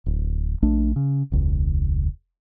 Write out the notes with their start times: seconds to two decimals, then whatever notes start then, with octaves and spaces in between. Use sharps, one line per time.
0.06 D1
0.62 A#1 A3 D4
0.96 C#3
1.32 E1 C#2